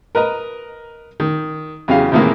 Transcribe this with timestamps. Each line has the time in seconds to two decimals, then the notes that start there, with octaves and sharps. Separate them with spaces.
0.15 A#4 B4 D#5 A#5
1.20 D#3
1.88 E2 C#3 F#3 G4 F5
2.12 A2 C3 D#3 E3 G#3 A#3